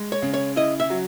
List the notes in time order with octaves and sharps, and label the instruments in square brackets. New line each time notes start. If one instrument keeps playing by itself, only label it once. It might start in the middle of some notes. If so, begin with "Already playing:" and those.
Already playing: [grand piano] G#3
[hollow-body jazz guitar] C#5
[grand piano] C#3
[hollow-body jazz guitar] C#5
[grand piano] E4 [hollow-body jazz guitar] D#5
[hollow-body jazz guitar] E5
[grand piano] F#3